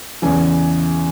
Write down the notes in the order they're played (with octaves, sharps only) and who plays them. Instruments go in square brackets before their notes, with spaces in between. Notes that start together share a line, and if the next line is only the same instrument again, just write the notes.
[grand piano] E2 C#3 E3 G#5